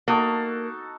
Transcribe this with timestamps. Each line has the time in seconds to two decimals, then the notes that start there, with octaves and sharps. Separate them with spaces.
0.08 A#3 D#4 F#4 A4